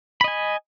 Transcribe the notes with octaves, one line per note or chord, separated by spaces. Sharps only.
D#5 G#5 B5